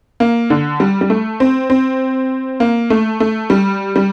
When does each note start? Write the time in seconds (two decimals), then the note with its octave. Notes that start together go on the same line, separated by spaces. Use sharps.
0.20 A#3
0.50 D3
0.80 G3
1.01 G3
1.10 A3
1.40 C4
1.70 C4
2.60 A#3
2.90 A3
3.20 A3
3.50 G3
3.96 G3